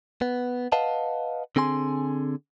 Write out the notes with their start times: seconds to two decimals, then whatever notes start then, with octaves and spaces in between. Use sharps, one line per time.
0.22 B3
0.72 B4 D#5 F5 F#5 A5
1.56 D3 C4 G#4 G#5 C6